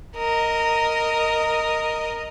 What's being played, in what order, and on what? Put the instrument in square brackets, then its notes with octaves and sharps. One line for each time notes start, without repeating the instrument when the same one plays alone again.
[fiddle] A#4 D#5